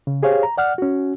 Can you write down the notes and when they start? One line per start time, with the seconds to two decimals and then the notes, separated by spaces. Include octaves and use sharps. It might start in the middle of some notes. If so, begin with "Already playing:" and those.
0.07 C#3
0.23 G4 G#4 C5 C#5 F5
0.43 A#5
0.57 D5 F#5 F6
0.78 C#4 F#4